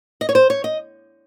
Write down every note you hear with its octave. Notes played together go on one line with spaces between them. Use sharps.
D#5
C#5
C5
C#5
D#5